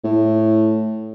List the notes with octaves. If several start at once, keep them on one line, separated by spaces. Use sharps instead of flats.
A2